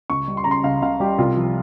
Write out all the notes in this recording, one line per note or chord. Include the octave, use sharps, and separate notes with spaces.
C#2 C#6
G3
C6
C#3 A#5
C6
C#2 F5
C#2 F5
G3 G4
C2 F4
F3